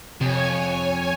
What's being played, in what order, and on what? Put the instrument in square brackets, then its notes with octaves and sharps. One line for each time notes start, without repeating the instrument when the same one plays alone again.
[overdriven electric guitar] F2 [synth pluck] C3 [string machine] C#5 G#5